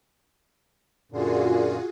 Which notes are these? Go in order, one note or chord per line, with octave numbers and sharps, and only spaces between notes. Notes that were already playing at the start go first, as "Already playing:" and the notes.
F#2 A#2 D3 F4 F#4 G#4